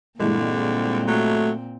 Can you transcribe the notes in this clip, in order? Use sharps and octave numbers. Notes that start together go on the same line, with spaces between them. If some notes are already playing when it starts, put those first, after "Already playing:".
G2 A#2 D3 E3 G#3 C4
F#3 A3